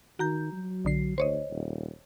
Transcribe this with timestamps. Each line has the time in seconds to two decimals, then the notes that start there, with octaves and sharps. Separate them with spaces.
0.19 D#3 F#4 A#5 G6
0.52 F#3
0.85 B1 D3 C7
1.18 D2 C5 C#5 D#5
1.51 D#1